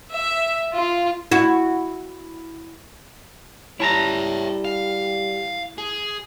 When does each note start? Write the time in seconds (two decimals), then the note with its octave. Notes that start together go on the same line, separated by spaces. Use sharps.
0.13 E5
0.74 F4
1.31 E4 F#4
3.80 G3 E4 C#5 E5 A5 A#5
4.65 F5
5.78 G#4